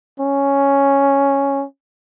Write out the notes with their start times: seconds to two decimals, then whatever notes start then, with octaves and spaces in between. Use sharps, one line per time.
0.20 C#4